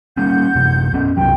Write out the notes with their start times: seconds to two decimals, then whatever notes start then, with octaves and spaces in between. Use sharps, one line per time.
0.17 G3 A#3 C#4 F#5 G6
0.55 F#2 C3
0.93 F#2 B3 C#4
1.17 C2 F#2 F#3 G5